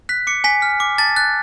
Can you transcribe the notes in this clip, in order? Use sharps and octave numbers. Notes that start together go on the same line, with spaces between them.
F#6 B6
D6 C#7
G#5 B6
F6
D6
A5 A6
F#6 A6